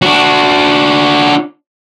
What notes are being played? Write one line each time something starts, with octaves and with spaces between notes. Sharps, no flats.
D4 F#4